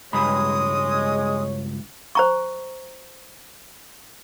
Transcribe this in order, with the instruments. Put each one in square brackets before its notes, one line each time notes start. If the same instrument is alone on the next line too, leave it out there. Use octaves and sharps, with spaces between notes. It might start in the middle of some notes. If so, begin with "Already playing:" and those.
[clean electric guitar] C#2 G2 B5 [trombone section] G#3 [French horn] C#5 [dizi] D#6
[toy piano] C5 A#5 C#6